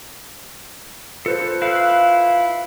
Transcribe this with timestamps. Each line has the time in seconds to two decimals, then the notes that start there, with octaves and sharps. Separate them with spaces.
1.26 F4 A4 B4 C5
1.62 E4 F5 F#6